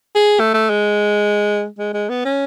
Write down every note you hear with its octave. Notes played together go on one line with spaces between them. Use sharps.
G#4
A3
A3
G#3
G#3
G#3
B3
C#4